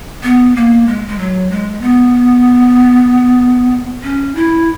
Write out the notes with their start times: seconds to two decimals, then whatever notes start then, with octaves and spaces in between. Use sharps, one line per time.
0.23 B3
0.56 A#3
0.87 G#3
1.08 G#3
1.19 F#3
1.51 G#3
1.81 B3
4.03 C#4
4.35 E4